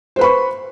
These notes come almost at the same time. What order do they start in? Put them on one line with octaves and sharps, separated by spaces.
C5 B4 B5 C#6